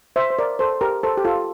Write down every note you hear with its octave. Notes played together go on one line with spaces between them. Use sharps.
C5 E5
C5
A#4 D5
A4 C5
G4 A#4
A4 C5
G4
F4 A4